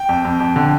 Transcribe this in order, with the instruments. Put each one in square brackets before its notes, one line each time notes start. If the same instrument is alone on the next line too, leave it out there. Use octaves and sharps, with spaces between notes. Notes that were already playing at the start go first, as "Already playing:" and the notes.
Already playing: [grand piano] G5
F2
F2
F2
D3